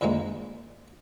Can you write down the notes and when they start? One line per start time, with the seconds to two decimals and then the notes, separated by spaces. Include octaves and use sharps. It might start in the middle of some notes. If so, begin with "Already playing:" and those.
0.01 F2 D3 D#3 G#3 A#3